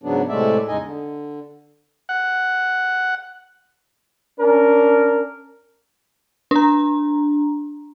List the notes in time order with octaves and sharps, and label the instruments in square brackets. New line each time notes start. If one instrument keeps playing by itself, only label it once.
[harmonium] G#2 C#3 F#3 B3 D4
A2 C3 G#3 A3 D5 E5
E2 C#3 G#3 D#4 D#5 G#5
D3
[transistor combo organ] F#5
[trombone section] C#4 D4 A#4
[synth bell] D4 A#5